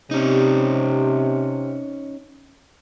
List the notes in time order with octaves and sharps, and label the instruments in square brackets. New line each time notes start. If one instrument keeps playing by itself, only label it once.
[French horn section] C3 [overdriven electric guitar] C#4 D#4